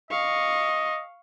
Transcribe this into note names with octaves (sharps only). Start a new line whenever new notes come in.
D#5 F5 C#6